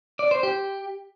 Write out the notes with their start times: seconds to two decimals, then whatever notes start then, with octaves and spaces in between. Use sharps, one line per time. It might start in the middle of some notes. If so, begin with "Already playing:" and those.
0.19 D5
0.31 C5
0.43 G4